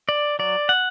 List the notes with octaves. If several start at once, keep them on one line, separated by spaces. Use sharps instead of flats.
D5
F#3 D5
F#5